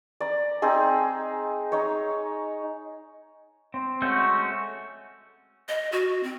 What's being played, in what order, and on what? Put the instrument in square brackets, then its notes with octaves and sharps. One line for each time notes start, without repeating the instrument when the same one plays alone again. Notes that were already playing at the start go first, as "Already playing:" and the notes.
[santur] D5 A#5
C4 D#4 G#4
D#4 C#5
[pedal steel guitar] C4
G#3 A3 C#4 F#4 G6
[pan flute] D#5
F#4
C4